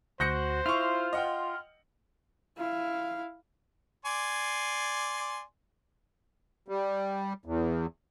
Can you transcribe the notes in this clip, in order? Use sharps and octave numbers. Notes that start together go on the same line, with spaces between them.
D2 F#4 C5 G6 A#6 C#7
E4 F4 C#6 F6
D#5 F#5 G5
E4 F5
D5 G#5 C6
G3
E2